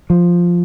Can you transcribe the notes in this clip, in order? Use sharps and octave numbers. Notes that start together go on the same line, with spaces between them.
F3